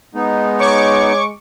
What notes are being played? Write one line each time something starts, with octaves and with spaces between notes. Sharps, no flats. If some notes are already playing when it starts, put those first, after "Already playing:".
G#3 B3 D#4
C#5 C#6 D6 C#7